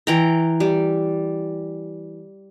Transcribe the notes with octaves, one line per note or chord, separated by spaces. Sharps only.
E3 G5 A#5
G3